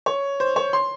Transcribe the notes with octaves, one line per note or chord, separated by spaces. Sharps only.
C#5
C5
C#5
C6